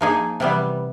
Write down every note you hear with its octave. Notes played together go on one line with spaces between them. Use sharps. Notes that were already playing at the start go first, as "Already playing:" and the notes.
F3 A#3 D#4 G#4
C3 E3 G3 B3